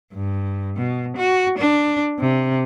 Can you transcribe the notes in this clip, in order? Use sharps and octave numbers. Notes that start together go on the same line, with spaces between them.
G2
B2
F#4
D4
C3